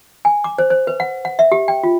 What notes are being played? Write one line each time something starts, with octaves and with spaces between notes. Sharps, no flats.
G#5
D6
C5
C5
B4
F#5
F#5
E5
G4
G5
F4